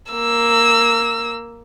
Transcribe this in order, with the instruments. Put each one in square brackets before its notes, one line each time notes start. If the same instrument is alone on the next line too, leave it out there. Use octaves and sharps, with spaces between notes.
[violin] A#3 E6